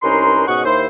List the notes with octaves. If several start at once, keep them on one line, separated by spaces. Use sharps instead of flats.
C2 C#4 D#4 A#4 B4 C6
G#2 B2 C#4 D#5 F#5 C#6
D#2 E4 C5